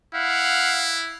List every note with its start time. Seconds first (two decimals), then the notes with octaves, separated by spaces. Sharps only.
0.15 E4 F5 F#5